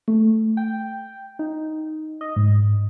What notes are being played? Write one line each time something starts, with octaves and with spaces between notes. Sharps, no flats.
A3
G5
D#4
D#5
G#2